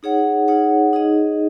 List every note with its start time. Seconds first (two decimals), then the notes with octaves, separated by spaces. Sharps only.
0.03 D#4 G#4 C#5 F#5
0.48 D#4 G#4 C#5 F#5
0.93 D#4 G#4 D#5